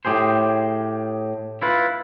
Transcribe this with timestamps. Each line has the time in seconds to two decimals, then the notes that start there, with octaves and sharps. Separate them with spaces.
0.05 A2 G4 G#4 C5
1.62 E4 F4 B4